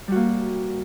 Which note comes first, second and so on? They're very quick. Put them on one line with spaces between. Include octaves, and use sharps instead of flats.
G3 F#4 A#3